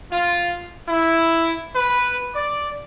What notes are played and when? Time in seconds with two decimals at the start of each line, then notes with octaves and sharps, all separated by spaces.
0.12 F4
0.89 E4
1.75 B4
2.34 D5